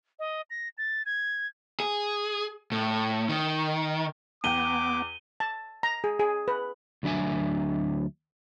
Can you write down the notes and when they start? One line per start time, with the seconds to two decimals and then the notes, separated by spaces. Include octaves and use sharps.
0.19 D#5
0.50 A#6
0.78 A6
1.06 G#6
1.80 G#4
2.72 A2
3.29 D#3
4.44 E2 B3 G5 D6 D#7 G7
5.40 A5
5.83 A#5
6.04 G#4
6.19 G#4
6.48 B4
7.03 D2 F#3 D4 E5 G#5